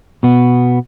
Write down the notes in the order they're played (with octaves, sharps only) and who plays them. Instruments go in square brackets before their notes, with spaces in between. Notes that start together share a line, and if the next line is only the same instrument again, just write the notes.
[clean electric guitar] B2 B3